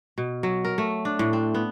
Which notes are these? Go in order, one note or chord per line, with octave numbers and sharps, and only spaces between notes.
B2
F#3
A#4
A3
D4
A2
C4
B3